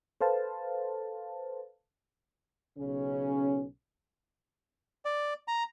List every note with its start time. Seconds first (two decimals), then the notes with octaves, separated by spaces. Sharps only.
0.21 A4 B4 C5 F5 A5
2.79 B1 C#3 C#4
5.05 D5
5.48 A#5